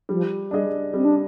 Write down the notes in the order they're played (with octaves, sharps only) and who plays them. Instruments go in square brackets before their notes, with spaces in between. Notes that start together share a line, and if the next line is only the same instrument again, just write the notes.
[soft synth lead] F3 [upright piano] G3
[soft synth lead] G3 [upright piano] D4 G#4 D#5
[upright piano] G3 [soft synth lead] C4
[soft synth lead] D4